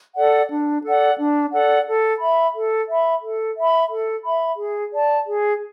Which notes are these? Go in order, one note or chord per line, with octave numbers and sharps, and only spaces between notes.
A4 D5 F#5
D4
A4 D5 F#5
D4
A4 D5 F#5
A4
E5 B5
A4
E5 B5
A4
E5 B5
A4
E5 B5
G#4
D5 A5
G#4